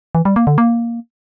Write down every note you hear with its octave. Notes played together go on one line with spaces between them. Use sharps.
E3
G3
A#3
D3
A#3